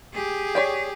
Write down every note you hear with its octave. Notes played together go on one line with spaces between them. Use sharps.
G4 G#4
C#5 D5 G5